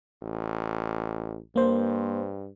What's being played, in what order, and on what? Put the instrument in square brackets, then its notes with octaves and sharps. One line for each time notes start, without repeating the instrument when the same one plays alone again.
[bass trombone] A1
[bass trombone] G2 [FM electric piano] A#3 C5